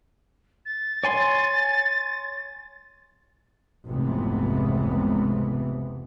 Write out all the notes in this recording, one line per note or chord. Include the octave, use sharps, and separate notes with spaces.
A6
C#5 G#5 C6
F1 C#2 G#2 C3 E3 B3